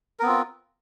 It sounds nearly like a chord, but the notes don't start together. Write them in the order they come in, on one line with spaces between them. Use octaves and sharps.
A#4 B3 C4 F4